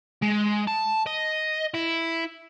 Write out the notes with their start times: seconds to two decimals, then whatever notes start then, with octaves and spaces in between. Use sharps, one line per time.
0.22 G#3
0.67 A5
1.06 D#5
1.74 E4